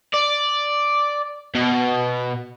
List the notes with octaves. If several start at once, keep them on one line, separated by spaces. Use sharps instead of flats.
D5
B2